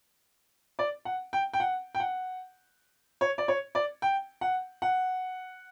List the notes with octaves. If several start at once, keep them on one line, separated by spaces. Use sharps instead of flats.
D5
F#5
G5
G5
F#5
G5
F#5
C#5
D5
C#5
D5
G5
F#5
F#5